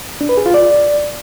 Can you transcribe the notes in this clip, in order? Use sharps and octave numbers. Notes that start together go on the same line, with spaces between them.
D4
B4
G#4
F4
D5